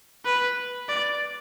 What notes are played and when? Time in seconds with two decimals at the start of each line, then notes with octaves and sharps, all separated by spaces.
0.25 B4
0.89 D5